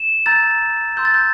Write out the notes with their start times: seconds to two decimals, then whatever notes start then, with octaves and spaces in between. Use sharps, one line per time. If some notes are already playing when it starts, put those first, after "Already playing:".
Already playing: E7
0.26 A#5 E6 G6 A6
0.97 C6 E6 G6
1.05 A6
1.14 G6